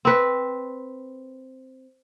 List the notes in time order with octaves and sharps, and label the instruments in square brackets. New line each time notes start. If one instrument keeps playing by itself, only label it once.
[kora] C4 B4